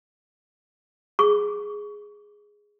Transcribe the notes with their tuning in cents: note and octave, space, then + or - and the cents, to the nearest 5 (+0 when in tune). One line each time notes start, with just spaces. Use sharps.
G#4 +0 C#6 +25